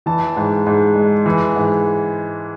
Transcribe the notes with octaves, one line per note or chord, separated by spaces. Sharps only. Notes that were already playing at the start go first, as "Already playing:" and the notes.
E3 A5
G#2
G#2
G#3
E3
G#2